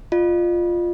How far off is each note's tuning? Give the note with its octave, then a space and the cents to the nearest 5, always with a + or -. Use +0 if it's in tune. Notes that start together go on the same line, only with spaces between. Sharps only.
F4 +0 D#5 -40